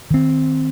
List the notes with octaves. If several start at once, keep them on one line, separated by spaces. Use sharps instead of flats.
D#3 C4